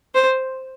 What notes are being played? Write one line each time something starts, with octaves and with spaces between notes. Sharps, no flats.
C5